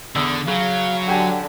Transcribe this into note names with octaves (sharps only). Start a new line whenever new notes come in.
E2 D3 D#6 E6
C#3 F#3 F5
D3 F#4 G4 G#5